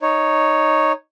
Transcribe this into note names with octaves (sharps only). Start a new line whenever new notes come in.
D#4 C#5